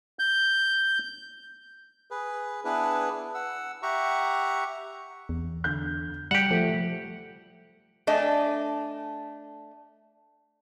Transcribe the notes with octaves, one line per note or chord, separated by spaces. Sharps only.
G6
G#4 B4
B3 D4 E4 G#4 B4
F#5 E6
G4 E5 F#5 A#5 C#6
E2
D3 G6
G3 G4 F#5 E7
F3 A3
A3 D4 D#5 G#5